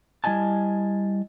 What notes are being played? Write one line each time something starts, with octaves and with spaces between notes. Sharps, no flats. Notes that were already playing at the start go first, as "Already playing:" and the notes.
G3 E4 D#5 G#5 A5